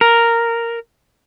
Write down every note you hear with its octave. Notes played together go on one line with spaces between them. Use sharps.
A#4